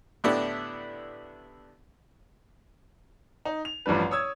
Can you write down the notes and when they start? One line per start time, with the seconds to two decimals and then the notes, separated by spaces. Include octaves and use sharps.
0.24 A2 D3 B3 D4 E4 G4
3.45 D#4
3.65 F7
3.86 A1 G2 F3 G3 B4
4.11 C#5 D#6 E6 G#6